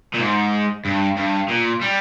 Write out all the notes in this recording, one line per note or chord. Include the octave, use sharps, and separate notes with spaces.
A#2
G#2
G2
G2
A#2
G3